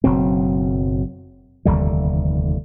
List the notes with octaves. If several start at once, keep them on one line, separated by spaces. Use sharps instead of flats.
F#1 B2 F#3 C4
F1 D#2 D3 G3